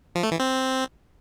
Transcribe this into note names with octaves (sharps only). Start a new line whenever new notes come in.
F3
A3
E3
C4